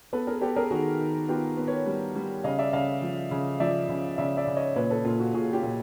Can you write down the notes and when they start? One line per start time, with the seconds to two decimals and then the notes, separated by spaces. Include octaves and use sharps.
0.13 B3 A4 B4
0.27 G#4 A#4
0.41 B3 G4 A4
0.56 G#4 A#4
0.71 D#3 F#4 G#4
1.00 D#3
1.28 B3 F4 G4
1.57 B3
1.67 B4 C#5
1.86 G3
2.15 G3
2.44 C#3 D#5 F5
2.59 D5 E5
2.73 C#3 D#5 F5
3.02 F3
3.31 C#3
3.60 F3 D5 E5
3.89 C#3
4.18 C#3 D5 E5
4.37 D5 E5
4.47 C#3
4.56 C#5 D#5
4.76 A#2 B4 C#5
4.90 A4 B4
5.05 A#2 F4
5.19 F#4
5.34 A#2 F#4 G#4
5.53 F4 G4
5.63 A#2